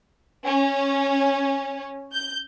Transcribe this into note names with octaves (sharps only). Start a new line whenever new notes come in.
C#4
G6